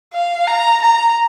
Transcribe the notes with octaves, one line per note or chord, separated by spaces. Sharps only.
F5
A#5
A#5